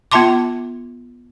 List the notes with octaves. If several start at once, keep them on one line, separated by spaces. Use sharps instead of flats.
B3 F4 E5 A5 C6 D6